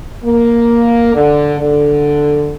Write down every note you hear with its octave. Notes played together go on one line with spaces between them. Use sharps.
A#3
D3
D3